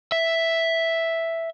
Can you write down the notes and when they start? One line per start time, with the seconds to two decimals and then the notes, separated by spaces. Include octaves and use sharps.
0.12 E5